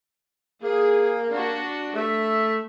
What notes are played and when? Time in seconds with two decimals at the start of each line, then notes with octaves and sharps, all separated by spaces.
0.63 A#3 G#4
1.28 D4 F#4
1.95 A3 E5